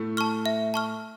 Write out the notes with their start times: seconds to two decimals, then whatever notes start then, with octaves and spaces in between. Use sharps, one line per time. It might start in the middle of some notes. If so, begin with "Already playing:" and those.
Already playing: A2 A3
0.17 A5 C#6 F6
0.46 E5
0.74 A5 C#6 F6